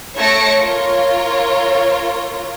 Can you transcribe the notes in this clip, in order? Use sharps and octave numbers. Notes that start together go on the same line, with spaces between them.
A3 C#5 A5 A#6 C#7 D7
F4 A#4 C#5